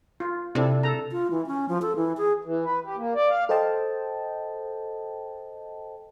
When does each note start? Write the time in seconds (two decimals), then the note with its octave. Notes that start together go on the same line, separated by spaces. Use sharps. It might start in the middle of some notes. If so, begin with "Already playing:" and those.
0.20 F4
0.55 C3 D4 E4 A4
0.83 A4 A#5
1.12 F4
1.31 E3
1.47 C#4
1.69 F3
1.82 A4
1.96 E3
2.17 G#4
2.45 E3
2.64 B4
2.85 G4
2.96 A#3
3.15 D5
3.30 F5
3.49 A4 C5 D#5 G5 A5